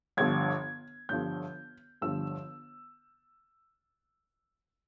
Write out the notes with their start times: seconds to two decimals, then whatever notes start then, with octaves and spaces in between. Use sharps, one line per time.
0.17 G1 G2 D3 F3 G#6
1.09 G1 G2 D3 F3 G6
2.02 G1 G2 D3 F3 E6